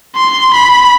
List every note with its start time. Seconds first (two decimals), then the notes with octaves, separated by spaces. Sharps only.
0.16 C6
0.54 B5